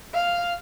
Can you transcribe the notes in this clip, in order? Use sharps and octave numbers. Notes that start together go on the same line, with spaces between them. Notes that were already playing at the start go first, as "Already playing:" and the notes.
F5